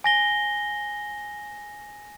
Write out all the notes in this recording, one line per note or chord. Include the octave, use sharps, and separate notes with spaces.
G#5 A#6 G7